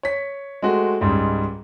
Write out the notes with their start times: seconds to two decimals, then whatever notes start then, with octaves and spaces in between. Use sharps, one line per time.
0.03 C#5 B6
0.62 G#3 A3 C4 F#4
1.01 C#2 G#2 G3